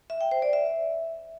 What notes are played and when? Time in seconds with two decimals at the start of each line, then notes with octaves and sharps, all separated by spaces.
0.10 E5
0.21 G5
0.31 C5
0.42 D5
0.53 E5